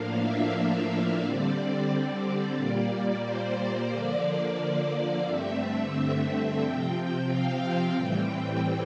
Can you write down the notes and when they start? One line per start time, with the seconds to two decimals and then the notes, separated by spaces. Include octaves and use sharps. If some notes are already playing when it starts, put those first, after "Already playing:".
Already playing: A2 F3 A#3 D4 F5
0.21 E5
1.22 D3 G3 C4 D5
1.89 D5
2.57 A#2 G3 A#3 D5
3.24 C5
3.91 D3 F3 A#3 D4 D5
5.26 G2 D3 A3 C4 E5
6.61 C3 F3 C4 G5
7.28 F5
7.95 A2 E3 G3 C4 G5